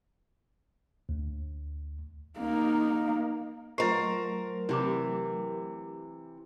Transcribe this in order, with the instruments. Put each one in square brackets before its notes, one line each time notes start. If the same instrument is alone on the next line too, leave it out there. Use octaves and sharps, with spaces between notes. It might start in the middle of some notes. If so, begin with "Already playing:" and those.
[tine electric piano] D2
[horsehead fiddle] A#3 D#4
[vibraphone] F#3 A3 [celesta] F4 D#5 C#6 [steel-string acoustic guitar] A#4 C5
[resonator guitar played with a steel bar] C3 E3 [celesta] E4 G4 D6